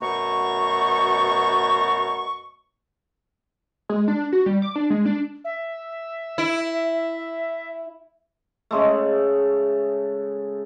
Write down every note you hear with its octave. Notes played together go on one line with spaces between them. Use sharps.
F#2 B2 A3 A#5 C#6
G#3
D4
F#4
G3
D6
D4
G#3
D4
E5
E4
C#3 G#3 A3